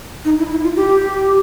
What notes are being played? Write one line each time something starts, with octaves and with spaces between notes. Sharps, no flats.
D#4
E4
E4
F4
G4